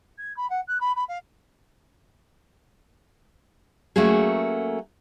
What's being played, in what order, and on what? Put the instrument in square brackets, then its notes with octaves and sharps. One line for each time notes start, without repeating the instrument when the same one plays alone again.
[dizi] G#6
B5
F#5
F#6
B5
B5
F5
[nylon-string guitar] F#3 A3 A#3 C#4 F#4 G#4